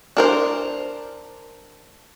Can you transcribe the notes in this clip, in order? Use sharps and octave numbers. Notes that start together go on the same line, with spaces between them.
D4 A#4 C5